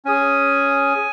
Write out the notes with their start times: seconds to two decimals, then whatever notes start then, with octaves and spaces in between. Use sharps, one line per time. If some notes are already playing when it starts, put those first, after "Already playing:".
0.05 C#4 G#4 G#5